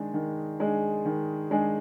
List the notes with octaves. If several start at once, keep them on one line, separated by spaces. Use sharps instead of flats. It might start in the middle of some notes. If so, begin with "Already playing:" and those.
Already playing: D#3 G#3 D4 G#4
D#3
G#3 D4 G#4
D#3
G#3 D4 G#4